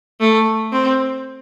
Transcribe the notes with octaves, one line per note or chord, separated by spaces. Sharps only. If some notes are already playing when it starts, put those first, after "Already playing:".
A3
C4